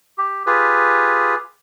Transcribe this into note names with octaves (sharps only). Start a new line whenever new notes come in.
G4
F4 G4 G#4 B4